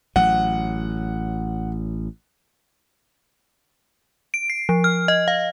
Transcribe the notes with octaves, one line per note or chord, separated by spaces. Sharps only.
A1 F#3 F#5
D7
C7
F3
F6
D#5
F5